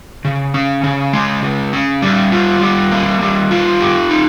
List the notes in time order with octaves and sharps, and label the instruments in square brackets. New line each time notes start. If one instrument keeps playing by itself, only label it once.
[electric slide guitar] C#3
C#4
C#3
G#3
C#3
C#4
G3
F4
G3
A#3
G3
F4
G4
D#4